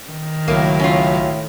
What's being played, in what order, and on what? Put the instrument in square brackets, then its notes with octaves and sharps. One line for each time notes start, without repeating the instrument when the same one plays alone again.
[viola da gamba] D#3
[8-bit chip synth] C#2 F#3 [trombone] A2 [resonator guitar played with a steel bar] A#3
[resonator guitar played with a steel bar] C#4 F4